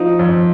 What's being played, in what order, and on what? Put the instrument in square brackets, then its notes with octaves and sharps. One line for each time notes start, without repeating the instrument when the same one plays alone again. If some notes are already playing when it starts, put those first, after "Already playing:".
Already playing: [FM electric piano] F3 [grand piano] D#4
[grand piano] F2